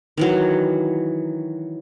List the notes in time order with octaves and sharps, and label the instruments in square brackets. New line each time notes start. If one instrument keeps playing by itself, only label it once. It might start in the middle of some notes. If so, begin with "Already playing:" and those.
[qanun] D#3 E3 F#3